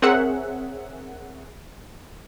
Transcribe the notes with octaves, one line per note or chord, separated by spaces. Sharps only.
C4 G#4 A#4 C#5 E5 F#5